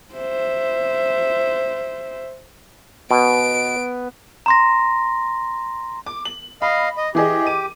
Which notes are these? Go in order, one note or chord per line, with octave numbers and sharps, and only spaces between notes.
C5 E5
B2 B3 D7
A#5 C6 A#6
D6
F#7
D#5 F5 B5
D#5
E3 G4 G#4 D#5
D6 D#7